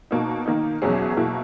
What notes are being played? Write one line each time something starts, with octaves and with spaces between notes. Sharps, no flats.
B2 A#3 D#4
D#3 A#3 D#4
E2 B2 F#3 C#4 G#4
B2 A#3 E4